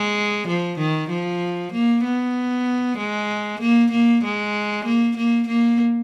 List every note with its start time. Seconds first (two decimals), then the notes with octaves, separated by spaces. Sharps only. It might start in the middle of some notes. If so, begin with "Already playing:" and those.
Already playing: G#3
0.48 F3
0.79 D#3
1.10 F3
1.73 A#3
2.04 B3
2.98 G#3
3.61 A#3
3.91 A#3
4.24 G#3
4.85 A#3
5.17 A#3
5.48 A#3